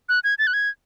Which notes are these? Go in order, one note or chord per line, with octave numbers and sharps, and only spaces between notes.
F#6
G#6
A6
F#6
G#6